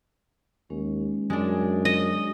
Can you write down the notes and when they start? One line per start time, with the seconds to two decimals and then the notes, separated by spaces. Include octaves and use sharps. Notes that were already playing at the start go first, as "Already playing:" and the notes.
0.70 D#2 G#3 C#4
1.30 F#2 G#3 D4 F#4
1.85 D#5